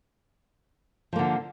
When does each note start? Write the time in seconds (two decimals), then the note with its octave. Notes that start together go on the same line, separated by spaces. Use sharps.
1.13 F3
1.16 A#3
1.19 D3